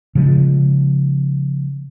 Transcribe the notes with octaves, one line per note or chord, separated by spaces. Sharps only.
C#3 F3 G#3